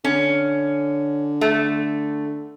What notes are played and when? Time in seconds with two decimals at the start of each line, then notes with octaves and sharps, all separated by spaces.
0.05 D3 C#4
1.41 A3